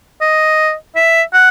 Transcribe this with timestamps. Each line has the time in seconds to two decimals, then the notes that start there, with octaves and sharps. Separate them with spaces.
0.21 D#5
0.96 E5
1.33 F#5